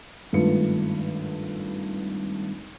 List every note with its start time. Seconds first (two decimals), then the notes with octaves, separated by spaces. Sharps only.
0.33 G#1 G2 A3 F4 B4 C#7